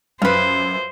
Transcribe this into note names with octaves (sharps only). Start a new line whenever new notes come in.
F#2 F4 B4 C5